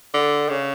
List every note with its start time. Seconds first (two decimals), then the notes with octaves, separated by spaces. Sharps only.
0.14 D3
0.49 C#3